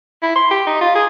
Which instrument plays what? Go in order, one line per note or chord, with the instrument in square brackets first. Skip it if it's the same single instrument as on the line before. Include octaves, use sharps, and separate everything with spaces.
[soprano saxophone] E4
C6
G4
D#4
F4
G#4